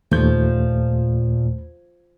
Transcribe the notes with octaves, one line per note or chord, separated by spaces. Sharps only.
D#2 A#2 F3 A3 G6